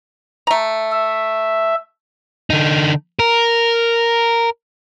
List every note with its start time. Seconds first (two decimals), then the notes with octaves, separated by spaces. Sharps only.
0.47 A3 A#5
0.92 E5
2.50 D3 D#4
3.19 A#4